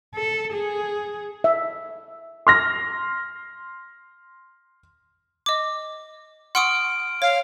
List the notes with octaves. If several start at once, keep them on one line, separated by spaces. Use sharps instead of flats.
A4
G#4
E5
C6 F6 A#6
D#5 D6
F#5 C6 C#6 D#6 F6 D7
C#5 F5